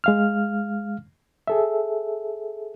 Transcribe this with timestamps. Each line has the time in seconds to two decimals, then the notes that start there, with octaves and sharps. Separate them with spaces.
0.04 G#3 F5 F6
1.48 G#4 A4 E5